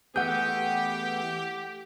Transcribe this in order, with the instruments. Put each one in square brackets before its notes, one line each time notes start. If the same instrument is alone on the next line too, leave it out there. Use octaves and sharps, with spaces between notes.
[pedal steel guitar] E3 A3 G#4 [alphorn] B3 [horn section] G4 [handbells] F#5 G6